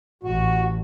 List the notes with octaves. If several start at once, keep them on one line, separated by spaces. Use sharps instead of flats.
A1 F#4